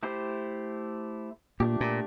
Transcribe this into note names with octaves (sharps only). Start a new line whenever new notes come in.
A3 E4 G4 C5
A#2 A3 D4 G4
A#2